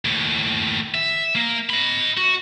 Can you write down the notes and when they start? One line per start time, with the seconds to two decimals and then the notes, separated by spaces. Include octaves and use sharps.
0.05 D#2 A2
0.95 E5
1.36 A#3
1.70 D#5 B5
2.17 F#4